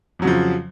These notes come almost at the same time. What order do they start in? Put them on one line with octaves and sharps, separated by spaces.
F2 F#3 C#3 F3